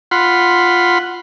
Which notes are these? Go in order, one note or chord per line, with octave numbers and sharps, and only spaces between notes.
F4 F#5 B5 C6